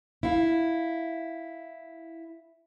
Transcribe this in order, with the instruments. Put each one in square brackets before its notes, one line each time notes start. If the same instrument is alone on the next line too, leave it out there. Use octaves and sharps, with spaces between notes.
[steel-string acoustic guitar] E4 F5